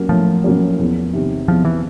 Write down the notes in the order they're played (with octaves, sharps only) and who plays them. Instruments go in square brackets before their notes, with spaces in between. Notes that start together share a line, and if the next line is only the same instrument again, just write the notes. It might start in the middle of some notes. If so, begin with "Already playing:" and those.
Already playing: [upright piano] F#3 A#3 C#4
[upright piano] A2 [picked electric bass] F3
[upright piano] F#3 A#3 C#4
E2
C3 D#3
[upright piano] E2 [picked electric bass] F3
[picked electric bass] E3